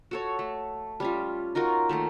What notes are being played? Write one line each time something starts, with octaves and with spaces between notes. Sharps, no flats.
F#4 A4 C#5
A3
G3 C#4 F4
D#4 F4 F#4 A#4
D#3 A3 A#3 A#4